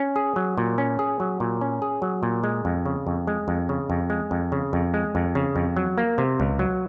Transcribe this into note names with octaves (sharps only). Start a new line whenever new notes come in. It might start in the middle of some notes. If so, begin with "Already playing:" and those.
Already playing: C#4
G#4
F#3
A#2
C#4
G#4
F#3
A#2
C#4
G#4
F#3
A#2
G#3
F2
C#3
F2
G#3
F2
C#3
F2
G#3
F2
C#3
F2
G#3
F2
C#3
F2
F#3
A#3
C3
C#2
F#3